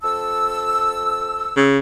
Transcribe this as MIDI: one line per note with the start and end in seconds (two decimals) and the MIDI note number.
0.03 1.64 41
0.03 1.64 81
0.03 1.64 88
1.56 1.79 49